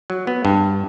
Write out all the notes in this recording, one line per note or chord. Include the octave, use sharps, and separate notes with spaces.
F#3
B3
G2